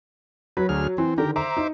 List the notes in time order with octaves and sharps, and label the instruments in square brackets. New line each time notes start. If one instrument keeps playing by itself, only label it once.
[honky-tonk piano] F#3 [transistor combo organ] B4
[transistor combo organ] D2 G#4 F6
[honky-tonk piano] E3 [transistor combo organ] C4
[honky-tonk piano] D3 D#3 [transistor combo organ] G4 A#4
[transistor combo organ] C5 E5 D6 [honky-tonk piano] A#5
[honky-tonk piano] D#4